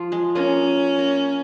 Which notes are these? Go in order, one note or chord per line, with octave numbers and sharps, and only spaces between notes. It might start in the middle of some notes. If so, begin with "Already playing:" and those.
Already playing: F3 F4
G#3 G#4
A#3 C#4 A#4
A#3 A#4